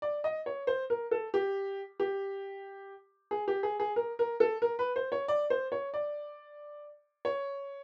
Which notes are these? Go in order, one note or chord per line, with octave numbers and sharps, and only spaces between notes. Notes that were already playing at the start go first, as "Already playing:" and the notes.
D5
D#5
C#5
C5
A#4
A4
G4
G4
G#4
G4
G#4
G#4
A#4
A#4
A4
A#4
B4
C5
C#5
D5
C5
C#5
D5
C#5